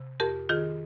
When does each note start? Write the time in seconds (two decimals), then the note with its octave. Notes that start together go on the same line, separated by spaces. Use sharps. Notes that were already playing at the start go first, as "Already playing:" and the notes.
Already playing: C3
0.20 F2 G4 A#4
0.49 D#3 F4 G#4